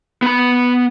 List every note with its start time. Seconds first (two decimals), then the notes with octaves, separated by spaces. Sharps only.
0.22 B3 B5